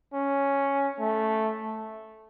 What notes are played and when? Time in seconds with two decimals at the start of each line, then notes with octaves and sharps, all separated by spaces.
0.14 C#4
0.99 A3